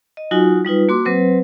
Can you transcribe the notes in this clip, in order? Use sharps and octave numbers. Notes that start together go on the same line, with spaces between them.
D#5
F#3 D#4 F4 F#4 G#5
G3 D#4 F4 B4
A#3 F#4 C6 D6
F#3 C4 B4 C5